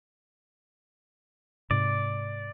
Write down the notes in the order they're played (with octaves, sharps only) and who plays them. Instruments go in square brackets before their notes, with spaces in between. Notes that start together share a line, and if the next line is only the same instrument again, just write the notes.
[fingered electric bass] G#2 C3 [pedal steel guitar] D5